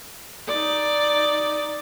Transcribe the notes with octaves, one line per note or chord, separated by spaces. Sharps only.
D#4 D5